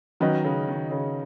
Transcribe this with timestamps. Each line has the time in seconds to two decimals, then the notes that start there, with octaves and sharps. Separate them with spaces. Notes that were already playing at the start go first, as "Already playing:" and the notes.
0.20 D#3 F#3 C#4 B4 D#5
0.44 C#3
0.68 D#3
0.91 C#3